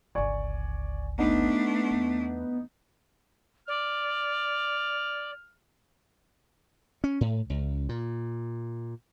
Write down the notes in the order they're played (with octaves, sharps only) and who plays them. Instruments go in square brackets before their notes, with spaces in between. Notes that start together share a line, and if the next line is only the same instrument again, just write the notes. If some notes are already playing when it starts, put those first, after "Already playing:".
[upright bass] G1 C#2 [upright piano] D5 G#5 C#6
[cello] A3 D4 [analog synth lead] B3 [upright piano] D#4
[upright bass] E2
[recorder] D5 [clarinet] F6
[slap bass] C#4
A2
C#2
A#2